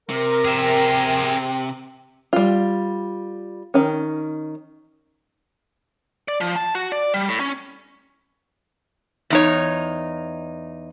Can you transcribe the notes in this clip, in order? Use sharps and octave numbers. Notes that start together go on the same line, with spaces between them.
C3 A#4
G#4 E5 G5
G3 F4
D#3 C#4
D5
F3
A5
F#4
D5
G3
A2
C#4
E2 D#4 C#5